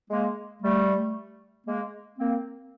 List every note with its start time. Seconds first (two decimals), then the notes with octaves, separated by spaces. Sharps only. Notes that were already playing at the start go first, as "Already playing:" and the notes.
0.10 G#3 A#3
0.63 G3 A3
1.66 G#3 A#3
2.19 A#3 C4